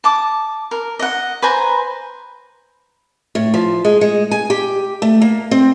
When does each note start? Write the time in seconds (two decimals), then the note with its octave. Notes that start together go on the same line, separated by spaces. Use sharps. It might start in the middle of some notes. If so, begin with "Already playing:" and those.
0.04 A5 D6 D#6
0.71 A#4
0.99 D#5 F#5
1.42 B4 C5 G#5 A#5
3.35 A2
3.54 F3
3.85 G#3
4.01 G#3
4.31 G#5
4.50 G4
5.02 A3
5.22 A#3
5.51 C4